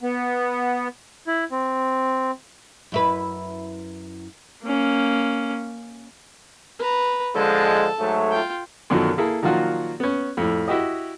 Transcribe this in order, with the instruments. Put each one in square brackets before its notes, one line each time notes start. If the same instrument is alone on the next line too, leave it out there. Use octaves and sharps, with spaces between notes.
[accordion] B3
[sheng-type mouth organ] E4
C4
[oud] F#2 E4 B4
[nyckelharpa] A#3 C#4
B4 A#5
[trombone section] D3 F3 G#3 [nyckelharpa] A4 A5
[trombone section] G#2 F#3 A3
[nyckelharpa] F4 G5
[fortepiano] F#2 B2 D3 D#3 F3 F#3
A#3 E4 G#4 A4
A#2 D#3 F3 F#3 F4 F#4
B3 C#4
F2 A2
E4 F#4 G4 D#5